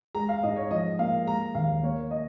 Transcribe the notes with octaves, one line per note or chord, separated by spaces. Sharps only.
G#3 A#5
F5
G#2 D#5
C#5
F3 D#5
A#3 F5
G#3 A#5
D#2 F5
A#3 C#5
D#5